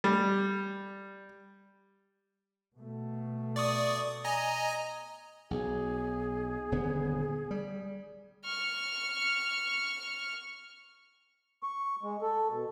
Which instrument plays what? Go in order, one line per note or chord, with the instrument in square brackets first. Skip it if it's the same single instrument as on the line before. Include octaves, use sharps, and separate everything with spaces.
[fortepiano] G3
[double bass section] B2 A3
[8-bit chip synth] D5 C#6 D#6
D#5 G#5 A#5
[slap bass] B1 [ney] G#4
[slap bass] D#1 D3 B3
G3
[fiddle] C#6 F6
[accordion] C#6
G#3
A4
B2